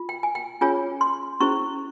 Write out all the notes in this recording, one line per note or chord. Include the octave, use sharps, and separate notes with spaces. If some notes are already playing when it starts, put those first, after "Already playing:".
Already playing: F4
G5
G#5
G5
C#4 F4 G#4 C#5 G#5
C6
C#4 E4 G#4 C5 C#6